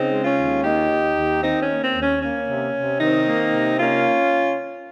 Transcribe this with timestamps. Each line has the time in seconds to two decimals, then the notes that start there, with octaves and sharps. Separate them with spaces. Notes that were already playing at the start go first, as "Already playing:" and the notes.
Already playing: C#3 C4 D#4
0.11 G#3
0.24 C#4 F4
0.37 D#2
0.63 A#3 D#4 G4
0.89 D#2
1.16 D#2
1.42 D#3 C4 D#4
1.62 C#4
1.69 A#3
1.82 C4
1.94 D#2
2.01 C#4
2.21 A#3 C#4
2.48 C3
2.74 C3
3.00 D#3 C4 D#4
3.27 A#3
3.52 C3
3.79 A#3 C#4 F4